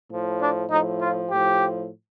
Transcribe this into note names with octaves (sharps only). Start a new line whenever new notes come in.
A2 F3
D4
A2 F3 D#4
F4
A2 F3 G4